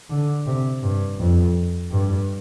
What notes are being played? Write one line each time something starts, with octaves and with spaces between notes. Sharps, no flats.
D3
C3
G2
F2
G2